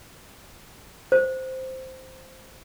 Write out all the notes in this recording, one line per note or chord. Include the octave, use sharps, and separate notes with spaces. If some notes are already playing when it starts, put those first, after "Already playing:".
C5